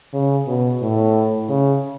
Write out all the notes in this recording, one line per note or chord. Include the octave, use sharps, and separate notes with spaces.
C#3
B2
A2
C#3